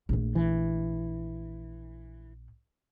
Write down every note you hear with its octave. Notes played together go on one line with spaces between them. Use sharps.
A#1 A3
E3